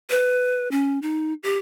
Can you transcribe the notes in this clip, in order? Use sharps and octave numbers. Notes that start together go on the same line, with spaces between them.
B4
C#4
D#4
G4